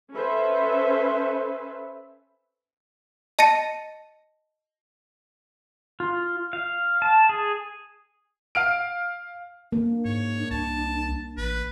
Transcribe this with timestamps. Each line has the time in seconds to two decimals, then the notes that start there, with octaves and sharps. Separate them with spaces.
0.14 C#4 A4 B4 C5 E5
3.39 D#5 A5 A6 A#6 C#7 D#7
6.00 F4
6.53 F5
7.02 A5
7.29 G#4
8.55 F5 F6 D7
9.72 A#3 D4
10.05 G#2 C#5
10.51 C2 A5
11.37 A1 B4